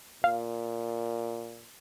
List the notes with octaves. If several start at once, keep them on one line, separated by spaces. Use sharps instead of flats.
A#2 F5